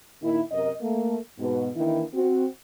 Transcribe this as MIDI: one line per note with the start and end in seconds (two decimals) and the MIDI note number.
0.22 0.40 46
0.22 0.40 51
0.22 0.40 58
0.22 0.40 63
0.22 0.40 64
0.52 0.71 42
0.52 0.71 48
0.52 0.71 70
0.52 0.71 75
0.81 1.16 57
0.81 1.16 58
1.39 1.68 44
1.39 1.68 47
1.39 1.68 59
1.75 2.03 51
1.75 2.03 52
1.75 2.03 58
1.75 2.03 62
1.75 2.03 64
2.14 2.45 60
2.14 2.45 66